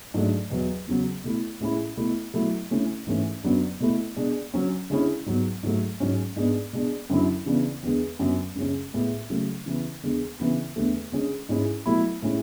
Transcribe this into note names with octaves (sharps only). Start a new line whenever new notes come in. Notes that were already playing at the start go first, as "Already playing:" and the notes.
G#2 F#3 A3 D4
E2 B2 F#3
E2 C#3 F#3
B2 A3 E4
A2 G#3 C#4 E4
B2 A3 E4
B2 F#3 A3 E4
D3 A3 C#4 E4
G#2 E3 A3 C#4
F#2 D3 F#3 B3 D4
B2 A3 E4
B2 G#3 D4
D3 F#3 C#4
D3 G#3 C#4 E4
G#2 F#3 B3
G#2 F#3 A3
G#2 F#3 C#4
G#2 G#3 B3 D4
B2 G#3 D4
F#2 D3 F#3 C#4 E4
C#3 E3 B3 D4
E2 D3 G#3
F#2 D3 F#3 B3
F#2 C#3 G#3 C#4
A2 G#3 B3
C#3 F#3 A3
C#3 E3 B3
E2 D3 G#3
C#3 E3 B3 D4
E2 D3 A3
D3 G#3 C#4
G#2 G#3 C#4 E4
B2 F#3 A3 E4
A2 G#3 C#4 E4